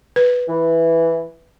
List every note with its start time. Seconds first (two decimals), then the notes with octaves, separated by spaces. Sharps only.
0.16 B4
0.49 E3